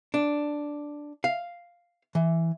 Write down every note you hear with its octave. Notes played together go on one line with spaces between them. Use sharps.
D4
F5
E3